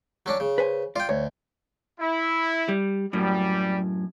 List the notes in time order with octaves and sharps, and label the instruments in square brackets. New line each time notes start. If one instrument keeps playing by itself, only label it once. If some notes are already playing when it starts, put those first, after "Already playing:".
[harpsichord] F#3 C#4 D4
C#3
[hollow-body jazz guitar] B4 C5 G#5
[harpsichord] F4 G5 [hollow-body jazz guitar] D5
[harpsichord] D2 [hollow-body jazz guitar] C#5
[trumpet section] E4
[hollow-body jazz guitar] G3
[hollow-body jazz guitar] F#2 A2 [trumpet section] G3